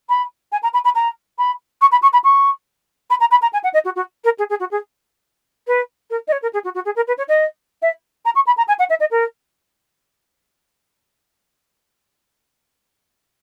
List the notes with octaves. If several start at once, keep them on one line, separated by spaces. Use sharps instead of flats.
B5
G#5
A#5
B5
B5
A#5
B5
C#6
B5
C#6
B5
C#6
B5
A#5
B5
A#5
G#5
F#5
D#5
F#4
F#4
A#4
G#4
G#4
F#4
G#4
B4
A#4
D#5
C#5
A#4
G#4
F#4
F#4
G#4
A#4
B4
C#5
D#5
E5
A#5
C#6
B5
A#5
G#5
F#5
E5
D#5
A#4